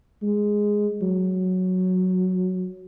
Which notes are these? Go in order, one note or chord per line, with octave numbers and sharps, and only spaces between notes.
G#3
F#3